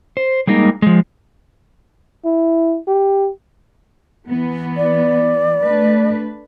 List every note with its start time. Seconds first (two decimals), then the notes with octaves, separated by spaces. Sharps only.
0.17 C5
0.47 G3 G#3 A#3 D#4
0.82 F3 G#3
2.25 E4
2.87 G4
4.28 E3 B3
4.77 D5
5.63 A3 D4 B4